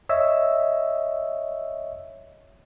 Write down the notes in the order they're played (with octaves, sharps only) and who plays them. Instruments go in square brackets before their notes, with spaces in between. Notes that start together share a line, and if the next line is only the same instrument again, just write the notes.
[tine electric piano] C#5 D#5 E5 E6